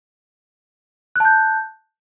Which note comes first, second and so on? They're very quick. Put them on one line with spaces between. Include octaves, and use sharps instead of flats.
F#6 A5 G6